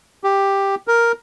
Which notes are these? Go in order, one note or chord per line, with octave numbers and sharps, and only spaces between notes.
G4
A#4